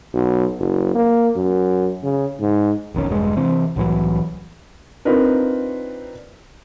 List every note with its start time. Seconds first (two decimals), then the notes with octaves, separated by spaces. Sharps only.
0.14 B1
0.60 F#1
0.95 A#3
1.36 F#2
2.04 C#3
2.41 G#2
2.94 F1 B1 D#3 C#4
3.09 E1 G2 G#3
3.37 C3 E3 C4
3.76 C2 A2 E3 F#3
5.05 C4 D4 D#4 F4 A#4 B4